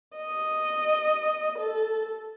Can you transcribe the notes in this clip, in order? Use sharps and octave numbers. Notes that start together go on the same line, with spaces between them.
D#5
A4